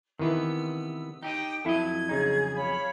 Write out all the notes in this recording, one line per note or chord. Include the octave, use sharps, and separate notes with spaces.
C3 D#3 E3 B3 E6
D#4 G4 D#5 G5 D#6
F2 F#3 E4 A4 D#5 G#6
C#3 D#4 G#4
C#5 F5 B5